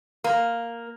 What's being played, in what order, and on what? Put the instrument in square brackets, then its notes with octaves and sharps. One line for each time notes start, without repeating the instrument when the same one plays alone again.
[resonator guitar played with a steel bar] A#3